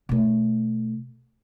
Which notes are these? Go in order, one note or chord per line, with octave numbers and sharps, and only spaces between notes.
B2 A3